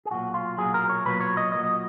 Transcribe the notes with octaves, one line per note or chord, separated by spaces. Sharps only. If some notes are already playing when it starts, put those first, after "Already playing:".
G#4
B1 A#2 F#3 F#4
F4
B1 A#2 F#3 G#4
A#4
C#5
B1 A#2 F#3 B4
C#5
D#5
B1 A#2 F#3 D#5
D#5